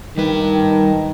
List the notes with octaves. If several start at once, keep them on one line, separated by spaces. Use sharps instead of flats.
D#3 G3 B4